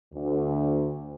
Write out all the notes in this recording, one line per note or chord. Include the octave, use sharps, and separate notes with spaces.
D2